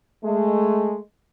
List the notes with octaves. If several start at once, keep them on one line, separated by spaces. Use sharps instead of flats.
G#3 A3